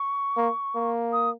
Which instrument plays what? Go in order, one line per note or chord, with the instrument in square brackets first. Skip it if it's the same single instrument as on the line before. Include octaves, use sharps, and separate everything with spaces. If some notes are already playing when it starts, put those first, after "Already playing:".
Already playing: [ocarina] C#6
[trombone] A#3
A#3
[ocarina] D#6